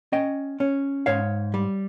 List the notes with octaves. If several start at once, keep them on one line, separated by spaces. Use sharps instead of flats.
C#4 D#5 G5
C#4
G#2 C#5 F5
G3